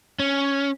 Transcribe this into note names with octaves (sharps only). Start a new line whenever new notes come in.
C#4